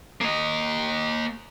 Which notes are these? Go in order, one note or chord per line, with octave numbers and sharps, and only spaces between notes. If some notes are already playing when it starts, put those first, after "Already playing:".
A#3 D#5